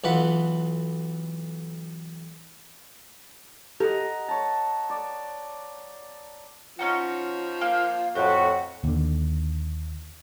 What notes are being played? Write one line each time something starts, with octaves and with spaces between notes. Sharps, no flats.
B1 E3 F4 F#5 B5
G4 A4 D#5 F#5 A#5
C#5 A5
D5
F3 C#4 D#4 F#4
A#3 F5
F2 A2 F#4 G4 F#5
D#2 D3